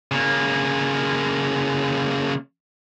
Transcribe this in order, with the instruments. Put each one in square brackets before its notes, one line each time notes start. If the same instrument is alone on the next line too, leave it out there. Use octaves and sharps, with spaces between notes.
[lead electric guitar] C#3 A#3